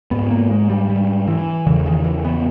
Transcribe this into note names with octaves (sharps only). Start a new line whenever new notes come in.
G#2 B3
A#3
G#3
G3
G3
E3
E2 C#3 E3
D#3
E3
B3